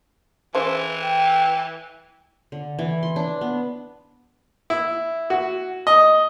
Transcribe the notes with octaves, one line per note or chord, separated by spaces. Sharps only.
C#3 E3 C5
G5
D3
E3
C6
D4
B3
E4
F#4
D#5